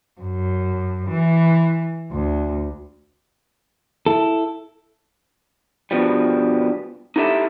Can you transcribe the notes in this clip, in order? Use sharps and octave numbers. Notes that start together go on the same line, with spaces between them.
F#2
E3
D2
E4 A4
G2 B2 F3 G3
D#4 E4 G4 A4 D#5 E5